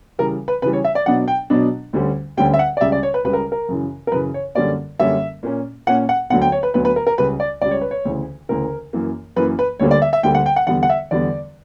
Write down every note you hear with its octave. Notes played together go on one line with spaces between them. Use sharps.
C#3 E3 G3 A#4
B4
C#3 E3 G3 B4
C#5
E5
D5
B2 F#3 B3 D4 F#5
G5
B2 F#3 B3 D4
D2 D3 G3 C#4
D2 D3 G3 C#4 G5
E5
F#5
D5
C#2 C#3 G3 E5
D5
C#5
B4
C#2 C#3 G3 B4
A#4
A#4
F#2 C#3 E3
A#4
F#2 C#3 E3 B4
C#5
F#2 D3 G3 A#3 C#4 D5
F#2 D3 G3 A#3 C#4 E5
A#2 A#3 C#4
A#2 A#3 C#4 F#5
F#5
D2 D3 F#3 B3 F#5
G5
C#5
B4
D2 D3 F#3 B3 B4
B4
A#4
A#4
C#2 C#3 G3 B4
D5
C#2 C#3 G3 D5
C#5
B4
C#5
D2 C#3 E3
D2 C#3 E3 A#4
F#2 E3 A#3
F#2 E3 A#3 B4
B4
D2 D3 G3 A#3 C#5
D5
E5
E5
D2 D3 G3 A#3 G5
F#5
G5
F#5
E2 D3 G3 B3 F#5
F#5
E5
E2 D3 G3 B3 D5